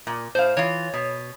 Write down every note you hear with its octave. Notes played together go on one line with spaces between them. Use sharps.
A#2
A2 C5 F5
E3 F4 C#5
B2